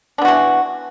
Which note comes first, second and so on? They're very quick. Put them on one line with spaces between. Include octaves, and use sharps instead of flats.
D4 B3 F#4 E3